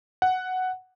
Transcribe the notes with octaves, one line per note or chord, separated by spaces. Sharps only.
F#5